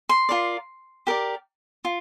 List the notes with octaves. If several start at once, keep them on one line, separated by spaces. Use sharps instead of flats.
C6
F4 A#4 D5
G4 A#4 D5
F4